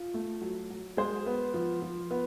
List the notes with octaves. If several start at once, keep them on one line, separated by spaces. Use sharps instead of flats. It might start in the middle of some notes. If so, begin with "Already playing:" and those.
Already playing: F4
A3
F#3
F#3
G#3 C5
B3
F3
F3
B3